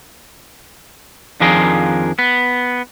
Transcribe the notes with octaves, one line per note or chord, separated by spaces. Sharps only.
F2 D#3 F3 D4 G#4 A#4
B3